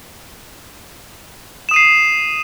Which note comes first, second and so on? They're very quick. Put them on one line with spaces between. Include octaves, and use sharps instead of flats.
E7 D#6 D#7 C7